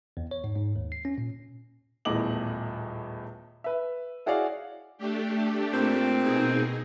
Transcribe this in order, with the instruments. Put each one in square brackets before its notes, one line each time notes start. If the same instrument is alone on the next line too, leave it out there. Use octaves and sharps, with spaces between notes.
[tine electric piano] E2
C#5
G#2
G#2
D#2
C7
C#4
A#2
[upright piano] D#1 E2 A2 D#5 D6 F#7
B4 E5
E4 F#4 G#4 C#5 D5 F5
[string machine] A3 D4 G4
[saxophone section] A#2 C4
[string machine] B2 D#4 G#4